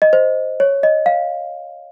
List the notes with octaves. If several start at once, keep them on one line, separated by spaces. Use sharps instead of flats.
D#5
C5
C#5
D#5
F5